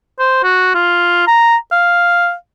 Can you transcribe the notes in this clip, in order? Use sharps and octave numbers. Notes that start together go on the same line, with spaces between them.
C5
F#4
F4
A#5
F5